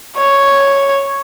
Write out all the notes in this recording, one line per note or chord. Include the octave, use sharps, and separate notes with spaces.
C#5